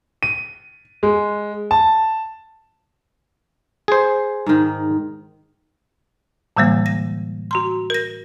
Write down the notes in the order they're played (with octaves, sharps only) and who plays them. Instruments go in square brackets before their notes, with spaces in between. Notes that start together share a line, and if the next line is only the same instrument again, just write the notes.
[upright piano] D#7
G#3
A5
[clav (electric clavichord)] G#4 C5
[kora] G#2 D#3
[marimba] A2 D3 E3 G3 G#3 A#3
A#6
F#4 A#5 C6
A#4 A#6